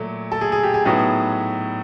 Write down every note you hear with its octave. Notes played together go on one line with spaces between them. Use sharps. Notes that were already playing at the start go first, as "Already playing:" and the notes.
Already playing: A#2 F#3 A3
A4
G#4
G#4
G4
G#4
A2 F#3 B3 D#4 G#4